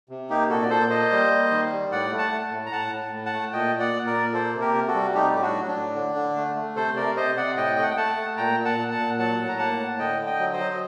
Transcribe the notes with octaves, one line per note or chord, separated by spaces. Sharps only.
C3
A#3 D#4 G4
A#2 F#4 A4
D5
A#2 A4 C5
A#3 C5 D#5
G3
A#3
D#3
G3
A2 D5 F#5
A3
F#5 A5
A3
A2
A#5
A2 F#5 A5
A2
A2
F#5 A5
A3
A#2 D#5 G5
A#2
D5 F#5
A#2
A#4 D5
A#2
A#3 A4 C5
C3
G4 A#4
C3
F#4 A4
G3
A3 D#4 G4
A2 G4
D4 F#4
F#3
D4
A2
D3
D3
A3
A3
C3 A4 C5
C3 A#4 D5
C3 C5 D#5
C3 D5 F#5
A2 D#5 G5
A3 D#5
F#5
G5
A3 F#5 A5
A3
A#2 G5 A#5
A#2
F#5 A5
A#2
F#5 A5
A#2
F#3 F#5 A5
A2
A#5
A#3 F#5 A5
A2
D3 D#5 G5
D3
D#5 G5
F#3
C5 D#5
F#3
D#5